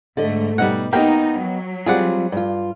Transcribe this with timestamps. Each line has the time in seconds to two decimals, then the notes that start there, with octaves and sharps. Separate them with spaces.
0.17 G#2 D3 A3 D#5
0.58 B2 G3 D#4 F#5
0.93 A#3 B3 D#4 G4 D#5 G5
1.38 F#3
1.86 G3 C4 F4 G#4 D5 F#5
2.32 G2 F4